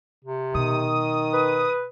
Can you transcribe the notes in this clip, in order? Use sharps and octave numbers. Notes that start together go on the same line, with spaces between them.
C3
B2 D#3 D#6
B4